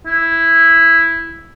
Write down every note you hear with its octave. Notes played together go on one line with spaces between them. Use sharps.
E4